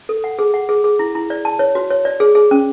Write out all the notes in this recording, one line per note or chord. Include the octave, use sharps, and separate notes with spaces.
A4
F#5
G#4
F#5
G#4
G#4
E4
E4
D5
A5
C#5
F#4
C#5
D5
G#4
G#4
C#4